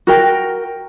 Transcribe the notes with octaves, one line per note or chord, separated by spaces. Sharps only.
F#4 A#4 G5